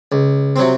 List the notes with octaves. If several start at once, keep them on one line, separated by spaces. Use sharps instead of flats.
C#2
C3 F#3 C4